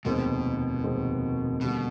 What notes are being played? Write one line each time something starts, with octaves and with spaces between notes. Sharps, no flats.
F1 D#2 B2 D#3 G#3 C4
F1 D#2 D#3 G#3 C4
B2 D3 G3 A#3